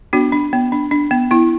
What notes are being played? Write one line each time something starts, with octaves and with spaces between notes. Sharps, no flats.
B3 D4 F#4
D4
B3
D4
D4
B3
B3 E4